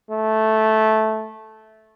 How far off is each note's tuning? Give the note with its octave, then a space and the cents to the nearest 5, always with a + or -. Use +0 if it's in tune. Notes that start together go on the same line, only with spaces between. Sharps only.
A3 -10